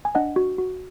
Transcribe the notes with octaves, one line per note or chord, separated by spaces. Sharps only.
G#5
D4 D#5 F#5
F#4
F#4